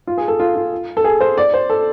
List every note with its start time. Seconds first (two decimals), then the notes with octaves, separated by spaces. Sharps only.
0.07 F4
0.18 G#4
0.28 A4
0.40 F4
0.55 F4
0.97 A4
1.04 G#4
1.20 C5
1.38 D5
1.54 C5
1.70 A4